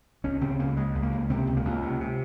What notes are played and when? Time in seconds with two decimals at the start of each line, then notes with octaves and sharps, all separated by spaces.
0.24 C#2 C#4
0.41 C#3 C4
0.59 C#2 A#3
0.77 C#3 G#3
0.95 C#2
1.03 A#3
1.13 C#2
1.30 C3 C4
1.47 C#2
1.57 A#3
1.65 C#2
1.83 C3
2.01 C3